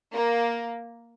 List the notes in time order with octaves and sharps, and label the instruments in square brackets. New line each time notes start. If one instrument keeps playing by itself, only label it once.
[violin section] A#3